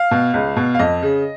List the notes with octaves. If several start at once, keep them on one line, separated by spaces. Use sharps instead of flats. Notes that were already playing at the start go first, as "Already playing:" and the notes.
Already playing: F5
B2
C#2
B2
F5
F2 D#5
C#3